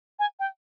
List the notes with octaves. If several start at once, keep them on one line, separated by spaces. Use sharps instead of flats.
G#5
G5